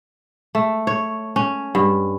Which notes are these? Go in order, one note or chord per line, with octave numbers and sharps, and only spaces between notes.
A3
C#5
C#4
G2